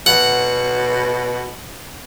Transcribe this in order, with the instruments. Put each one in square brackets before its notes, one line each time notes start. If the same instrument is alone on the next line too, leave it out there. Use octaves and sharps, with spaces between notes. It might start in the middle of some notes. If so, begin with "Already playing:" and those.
[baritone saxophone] B2 [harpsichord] F#5